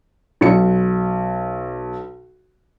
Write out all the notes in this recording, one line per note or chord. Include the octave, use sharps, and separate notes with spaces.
B1 C#7